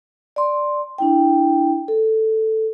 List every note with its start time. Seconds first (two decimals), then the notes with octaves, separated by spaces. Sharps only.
0.36 D5 C6
0.98 D4 E4 G5
1.88 A4